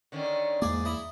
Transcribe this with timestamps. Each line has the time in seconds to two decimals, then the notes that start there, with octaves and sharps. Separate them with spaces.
0.12 D3 D#3 C#4
0.62 E2 G#2 A#3 G#4 D5
0.85 E4 D#5 A#5